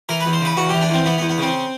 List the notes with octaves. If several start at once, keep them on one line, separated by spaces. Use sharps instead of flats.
E3 A#4
E2 B4
C5
C#3 B4
E2 F#4
E3 G4
D4
E2 C4
E3 B3
B3
E2
B3
C#3 C4